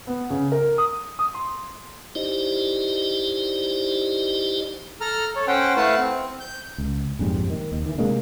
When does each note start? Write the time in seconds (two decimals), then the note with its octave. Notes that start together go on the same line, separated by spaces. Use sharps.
0.07 B3
0.30 C#3
0.52 A#4
0.78 D#6
1.19 D#6
1.35 C6
2.15 D#4 E4 G4 C5 D5 D#5
5.01 A4 A#5 F6
5.36 A4 C#5
5.48 C#4 C5 F#5 G5
5.77 A3 E4 B4 F5 F#5 A5
5.98 C4
6.40 G6
6.78 C#2
7.19 A#1 F2 G#2 G3
7.50 D#3
7.72 D#2
7.86 D#3 E3
7.98 C3 G#3 A#3 D4